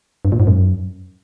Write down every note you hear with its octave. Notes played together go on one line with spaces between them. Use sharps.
G2
A#2
G#2
F#2